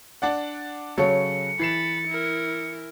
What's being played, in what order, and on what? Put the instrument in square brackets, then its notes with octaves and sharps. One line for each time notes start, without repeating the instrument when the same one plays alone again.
[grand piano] D4 D5 F#5
[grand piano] C#3 F#3 [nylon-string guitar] A4 C#5 [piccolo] C#7
[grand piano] E3 C7 E7 [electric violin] B5 A6
[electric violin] E4 A#4